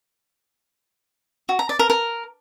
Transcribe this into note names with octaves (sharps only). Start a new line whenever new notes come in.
F#4
A#5
D5
A#4
A#4